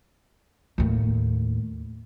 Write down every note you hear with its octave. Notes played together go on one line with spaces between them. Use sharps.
D#2 A2